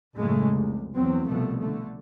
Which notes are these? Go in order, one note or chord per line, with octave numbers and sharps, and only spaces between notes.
F#1 A2 C#3 G#3 A3
F1 C2
E2 F#3 C4
C2 B2 F3 A3
D3 A3